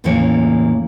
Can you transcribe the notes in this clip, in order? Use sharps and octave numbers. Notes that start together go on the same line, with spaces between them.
E2 A2 C#3 E3 A#3 C#5